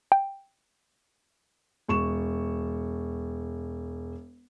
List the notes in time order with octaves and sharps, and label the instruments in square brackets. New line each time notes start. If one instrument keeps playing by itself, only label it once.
[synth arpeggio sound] G5
[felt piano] E1 C#6 E7